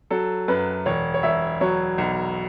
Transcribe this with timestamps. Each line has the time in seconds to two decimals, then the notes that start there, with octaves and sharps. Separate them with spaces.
0.11 F#3 A4
0.48 F#2 B4
0.86 E1 C#5
1.14 C#5
1.23 E1 E5
1.61 F#3 C#5
1.98 B1